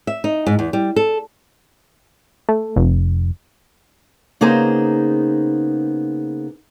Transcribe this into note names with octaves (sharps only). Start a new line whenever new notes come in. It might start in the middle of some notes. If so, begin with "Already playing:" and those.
E5
D#4
G#2
E2
G3
A4
A3
F1
C#3 A#3 B3 D#4 G#4 C5